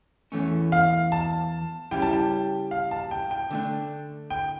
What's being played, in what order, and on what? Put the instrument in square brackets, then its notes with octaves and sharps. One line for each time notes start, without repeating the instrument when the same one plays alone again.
[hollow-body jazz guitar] E2 E3 A3 C#4
[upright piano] F5
A5
[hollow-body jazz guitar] C#3 G3 C#4 E4 [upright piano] G5
[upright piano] A5
G5
F5
A5
G5
G5
[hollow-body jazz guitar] D3 A3 D4
[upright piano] G5